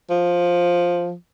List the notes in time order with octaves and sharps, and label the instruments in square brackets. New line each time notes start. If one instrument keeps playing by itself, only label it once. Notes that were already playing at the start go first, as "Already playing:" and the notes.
[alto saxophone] F3